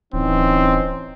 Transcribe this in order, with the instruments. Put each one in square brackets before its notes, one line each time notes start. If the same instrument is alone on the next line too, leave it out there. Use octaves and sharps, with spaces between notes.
[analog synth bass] D1 [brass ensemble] E3 C#4 D#4 [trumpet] C4